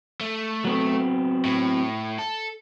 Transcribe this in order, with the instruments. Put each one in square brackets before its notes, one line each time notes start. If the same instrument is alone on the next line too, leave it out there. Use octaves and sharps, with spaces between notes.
[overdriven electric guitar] A3
[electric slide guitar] F#3 B3 C4
[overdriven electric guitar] A2
A4